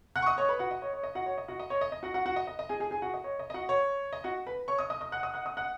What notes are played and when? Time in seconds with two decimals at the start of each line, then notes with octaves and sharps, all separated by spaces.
0.16 F#5 F#6
0.22 C#6
0.26 D#5 D#6
0.38 C#5 C#6
0.49 B4 B5
0.59 F#4 F#5
0.71 D#5
0.82 C#5
0.94 C#5
1.03 D#5
1.15 F#4 F#5
1.26 C#5
1.38 D#5
1.48 F#4 F#5
1.60 D#5
1.70 C#5
1.81 D#5
1.92 D#5
2.03 F#4 F#5
2.14 F#4 F#5
2.26 F#4 F#5
2.36 D#5
2.47 D#5
2.59 D#5
2.69 G#4 G#5
2.80 G#4 G#5
2.91 G#4 G#5
3.02 F#4 F#5
3.14 D#5
3.24 C#5
3.39 D#5
3.50 D#5
3.54 F#4 F#5
3.69 C#5
4.13 D#5
4.24 F#4 F#5
4.47 B4 B5
4.68 C#5 C#6
4.79 D#5 D#6
4.90 D#5 D#6
5.01 D#5 D#6
5.12 F#5 F#6
5.23 D#5 D#6
5.34 F#5 F#6
5.45 D#5 D#6
5.57 F#5 F#6